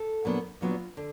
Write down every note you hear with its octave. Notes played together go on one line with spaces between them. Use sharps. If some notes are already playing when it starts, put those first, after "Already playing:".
Already playing: A4
A#2 F#3 B3 D4
A#2 F#3 B3 D4 F4
D3